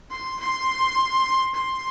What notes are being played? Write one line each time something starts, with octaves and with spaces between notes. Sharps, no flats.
C6
C6
C6